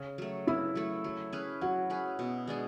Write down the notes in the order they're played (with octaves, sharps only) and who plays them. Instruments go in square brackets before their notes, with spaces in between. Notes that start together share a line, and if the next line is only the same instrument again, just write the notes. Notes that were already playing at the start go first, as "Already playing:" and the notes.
Already playing: [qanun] C#3
F#3 A3
[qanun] C#3 [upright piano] E4
[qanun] F#3 A3
F#3
C#4 G#4 B4
[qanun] F#3 [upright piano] F#4
[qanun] C#4 G#4 B4
B2
G#3 D4 G#4